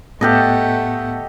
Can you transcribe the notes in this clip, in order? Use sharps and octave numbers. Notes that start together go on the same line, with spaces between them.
A2 A3 B3 G4 A4 D#5 F#5 F#6